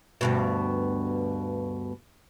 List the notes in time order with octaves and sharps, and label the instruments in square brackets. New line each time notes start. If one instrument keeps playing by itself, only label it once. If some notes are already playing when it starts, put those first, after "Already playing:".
[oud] D2 G2 B2